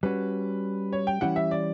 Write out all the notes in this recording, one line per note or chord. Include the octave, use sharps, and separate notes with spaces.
G3 C#4 F#4 B4
C#5
G5
E3 G3 C#4 E4 G4 F#5
E5
D5